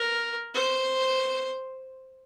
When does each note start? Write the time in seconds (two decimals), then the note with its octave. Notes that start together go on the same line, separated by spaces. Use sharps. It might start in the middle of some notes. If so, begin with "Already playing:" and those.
Already playing: A#4
0.54 C5